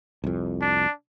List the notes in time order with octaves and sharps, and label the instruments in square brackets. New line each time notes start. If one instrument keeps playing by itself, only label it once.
[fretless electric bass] C2 F2
[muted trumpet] D4